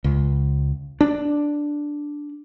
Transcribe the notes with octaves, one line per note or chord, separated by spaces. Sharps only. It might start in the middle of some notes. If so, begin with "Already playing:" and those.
C#2
D4